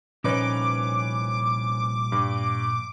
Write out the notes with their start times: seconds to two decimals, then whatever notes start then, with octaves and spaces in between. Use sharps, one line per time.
0.24 C2 A#2 F3 C#4 D#4 B4 C#5 D6
2.12 G2